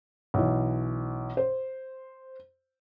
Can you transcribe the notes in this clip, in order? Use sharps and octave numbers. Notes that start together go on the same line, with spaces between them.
B1 E3
C5